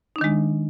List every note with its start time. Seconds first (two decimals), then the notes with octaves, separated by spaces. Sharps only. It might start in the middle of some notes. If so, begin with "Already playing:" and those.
0.16 D#4
0.18 D4
0.21 D#3
0.24 G#3